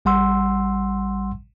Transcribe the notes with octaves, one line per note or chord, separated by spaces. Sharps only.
A1 G3 F#5 C6 E6